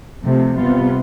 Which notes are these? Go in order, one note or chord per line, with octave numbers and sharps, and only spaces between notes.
C3 F3 A3
C3 G3 B3 F4